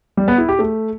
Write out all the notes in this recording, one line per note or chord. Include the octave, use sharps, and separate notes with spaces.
G3
B3
E4
G4
A3